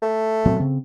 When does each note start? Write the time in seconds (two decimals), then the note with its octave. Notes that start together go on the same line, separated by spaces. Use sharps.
0.02 A3
0.45 A#2 F#3 C4
0.59 C#3 C4